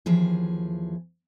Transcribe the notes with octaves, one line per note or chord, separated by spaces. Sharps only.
D#2 E3 F3 G#4